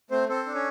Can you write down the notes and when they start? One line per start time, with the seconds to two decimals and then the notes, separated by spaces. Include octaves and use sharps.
0.11 A3 C4 C5
0.29 C4 A4 C5
0.46 D4
0.55 C#4 C#5